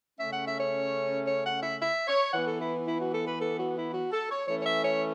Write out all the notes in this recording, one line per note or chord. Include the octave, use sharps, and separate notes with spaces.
C#3 A3 C#4 E5
F#5
E5
C#5
C#5
F#5
E5
E5
C#5
E3 B3 F#5
A4
E4
E4
F#4
A4
B4
A4
F#4
E4
F#4
A4
C#5
E3 A3 C#4 C#5
C#5
E5
C#5